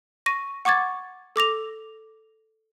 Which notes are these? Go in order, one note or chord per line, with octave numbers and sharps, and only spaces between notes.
C#6 A#6 D#7
F#5 C#6 D6 G#6 A6
A4 D6 A#6 F7